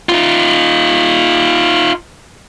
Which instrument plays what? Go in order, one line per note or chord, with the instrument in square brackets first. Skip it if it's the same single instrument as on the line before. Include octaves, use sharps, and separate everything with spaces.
[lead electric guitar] D#4 F4